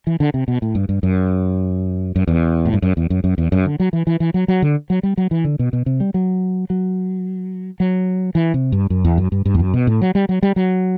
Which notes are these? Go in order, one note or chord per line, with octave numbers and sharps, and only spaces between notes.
E3
D3
C3
B2
A2
G2
G2
F#2
F#2
E2
A2
G2
F#2
E2
F#2
F#2
E2
F#2
D3
F#3
E3
E3
E3
F#3
F#3
D3
F#3
G3
F#3
E3
D3
B2
B2
C3
G3
F#3
F#3
F#3
E3
C3
G2
F#2
E2
F#2
G2
G2
E2
F#2
B2
A2
F#3
G3
F#3
G3
F#3